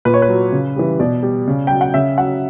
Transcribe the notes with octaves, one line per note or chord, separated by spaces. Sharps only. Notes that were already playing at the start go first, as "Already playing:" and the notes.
A#2 B4
C#5
B4
F#3
C#3
E3 G3
B2 D5
G3
C#3
F#3 G5
F#5
C#3 E5
F#3 F#5